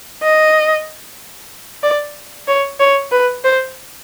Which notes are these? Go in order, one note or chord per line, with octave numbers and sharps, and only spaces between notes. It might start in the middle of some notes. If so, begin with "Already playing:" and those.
D#5
D5
C#5
C#5
B4
C5